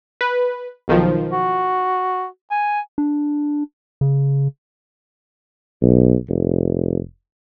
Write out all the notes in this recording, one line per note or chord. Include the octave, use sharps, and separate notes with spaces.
B4
B1 D#3 F3
F#4
G#5
D4
C#3
B1
F1